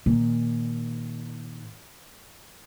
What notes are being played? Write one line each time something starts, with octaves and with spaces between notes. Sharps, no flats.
A#2 D#3